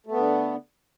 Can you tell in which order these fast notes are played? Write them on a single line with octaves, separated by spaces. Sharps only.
A3 B3 D3